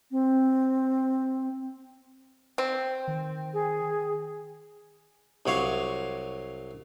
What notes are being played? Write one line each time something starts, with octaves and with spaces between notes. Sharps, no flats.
C4
C4
D#3
G#4
C2 F#3 C#5 F5